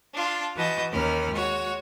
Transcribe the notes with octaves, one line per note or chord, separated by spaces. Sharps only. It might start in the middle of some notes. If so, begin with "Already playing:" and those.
D4 F4
E3 F#4 B4 D#5 A5 G6
D#2 C#4 A#4 B5 F6
G#3 F#4 C#5